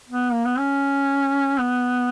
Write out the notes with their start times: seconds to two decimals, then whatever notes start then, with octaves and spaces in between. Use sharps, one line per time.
0.09 B3
0.32 A#3
0.45 B3
0.59 C#4
1.59 B3